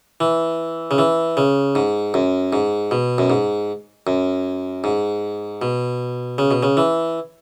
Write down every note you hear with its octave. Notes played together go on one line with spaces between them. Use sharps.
E3
C#3
E3
C#3
G#2
F#2
G#2
B2
F#2
G#2
F#2
G#2
B2
C#3
B2
C#3
E3